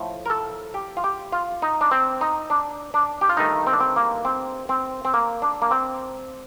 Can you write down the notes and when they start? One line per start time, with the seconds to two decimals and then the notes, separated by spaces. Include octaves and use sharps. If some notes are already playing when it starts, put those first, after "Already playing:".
Already playing: A2 F3 A3
0.26 A#4
0.30 A4
0.74 G4
0.97 F4
1.04 G4
1.32 F4
1.62 D#4
1.81 D4
1.91 C4
2.21 D#4
2.50 D4
2.94 D4
3.21 G4
3.29 F4
3.37 G2 D#3 A3 D#4
3.67 C4
3.73 D4
3.80 C4
3.96 A#3
4.25 C4
4.69 C4
5.05 C4
5.14 A#3
5.42 D4
5.62 A#3
5.71 C4